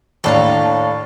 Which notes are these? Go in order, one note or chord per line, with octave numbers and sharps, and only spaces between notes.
D#2 A2 D4 A4 F5 A#5